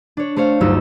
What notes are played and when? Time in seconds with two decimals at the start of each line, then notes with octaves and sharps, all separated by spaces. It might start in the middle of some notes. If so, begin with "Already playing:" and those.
0.17 D4 C#5
0.36 A3 C5 C#5 F5
0.61 G1 D2 F#3 C#4 D#4 E6